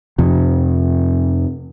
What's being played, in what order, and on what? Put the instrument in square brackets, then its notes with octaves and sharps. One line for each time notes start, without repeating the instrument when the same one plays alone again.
[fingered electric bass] F2 C3